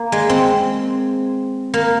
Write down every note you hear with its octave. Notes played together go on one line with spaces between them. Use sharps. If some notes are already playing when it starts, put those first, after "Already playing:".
Already playing: A#3
G#3
C4
A#3